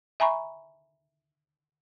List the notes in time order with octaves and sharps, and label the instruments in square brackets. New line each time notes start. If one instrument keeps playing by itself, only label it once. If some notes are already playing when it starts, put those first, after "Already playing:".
[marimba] E5 G#5 A#5 B5 C#6